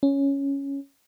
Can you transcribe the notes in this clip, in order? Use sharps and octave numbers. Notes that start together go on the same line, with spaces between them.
C#4